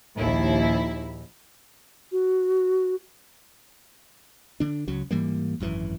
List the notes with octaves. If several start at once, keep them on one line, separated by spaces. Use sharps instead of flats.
A#1 D#2 E4
F#4
D3 D4
C#2 C#3 F#3
G#2 E3 G3 A#3
G#1 F#2 E3